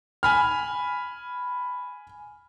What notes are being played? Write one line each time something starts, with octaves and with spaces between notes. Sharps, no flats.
G#5 B5 F6